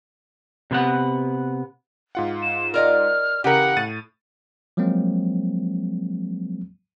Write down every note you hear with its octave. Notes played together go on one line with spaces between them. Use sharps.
C3 B3 F#5
G#2 F4 F#5
E7
A#4 D5 D#5 F6
C#3 E3 G4 A#4 F#5
A2 A6 D#7
F3 F#3 G#3 A#3 C4